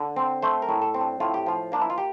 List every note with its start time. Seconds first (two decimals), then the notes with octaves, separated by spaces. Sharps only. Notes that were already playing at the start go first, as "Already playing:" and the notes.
Already playing: D3
0.16 C4
0.43 A3 C5
0.62 A#4
0.69 A2
0.82 A4
0.94 C4
1.01 D4
1.20 A2 F4
1.34 G4
1.46 F3 F4
1.72 A#3 D4
1.81 E4
1.90 F4
1.98 G4